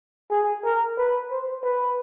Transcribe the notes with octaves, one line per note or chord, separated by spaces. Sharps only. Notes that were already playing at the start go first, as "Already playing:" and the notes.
G#4
A#4
B4
C5
B4